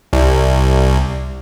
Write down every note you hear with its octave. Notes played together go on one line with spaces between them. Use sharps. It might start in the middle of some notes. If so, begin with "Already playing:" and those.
C2